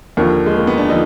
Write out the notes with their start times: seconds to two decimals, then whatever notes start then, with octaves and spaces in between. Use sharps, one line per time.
0.17 D#2 D3 F3 A#3
0.46 G#3
0.57 A#3
0.67 B3
0.78 D4
0.89 D3 F3 D#4